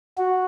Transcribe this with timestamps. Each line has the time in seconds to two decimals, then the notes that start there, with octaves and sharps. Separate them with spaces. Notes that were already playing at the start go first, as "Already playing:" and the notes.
0.18 F#4